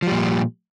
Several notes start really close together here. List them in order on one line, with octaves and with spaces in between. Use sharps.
F3 G3 A#2